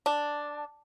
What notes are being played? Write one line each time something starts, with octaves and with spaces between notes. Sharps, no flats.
D4